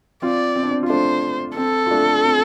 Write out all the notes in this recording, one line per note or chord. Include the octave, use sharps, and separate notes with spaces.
C4 F4 D5
C4
D4
C4
F4
A3 D4 C5
C4 A4
F4
A3 D4
C4 F4